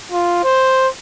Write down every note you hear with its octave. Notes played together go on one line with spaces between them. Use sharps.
F4
C5